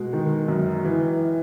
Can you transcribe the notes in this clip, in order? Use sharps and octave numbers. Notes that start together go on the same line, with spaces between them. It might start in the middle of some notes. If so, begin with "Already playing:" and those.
Already playing: B2 G#3
D#3
F#2
E3